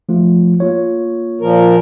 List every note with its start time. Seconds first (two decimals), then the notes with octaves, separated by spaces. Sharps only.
0.09 F3 A3 F4
0.60 A#3 F4 C#5
1.41 A#2 F3 A#4